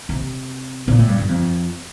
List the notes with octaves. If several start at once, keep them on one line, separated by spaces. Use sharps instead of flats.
C3
A#2
A2
G2
G2
F2